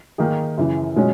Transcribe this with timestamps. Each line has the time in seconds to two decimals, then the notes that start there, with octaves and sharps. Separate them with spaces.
0.18 D#3 A#3 D#4 G#4
0.58 F#2 C#3 E3
0.96 B2 G#3 C#4